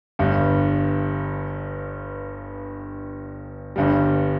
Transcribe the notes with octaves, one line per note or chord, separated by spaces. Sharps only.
G1 G2 G3
G1 G2 G3